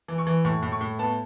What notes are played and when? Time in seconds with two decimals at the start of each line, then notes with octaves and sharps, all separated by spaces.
0.08 E3
0.18 C#6
0.27 E3
0.45 A2 C#6
0.63 A2
0.72 C#6
0.81 A2
0.99 B3 A5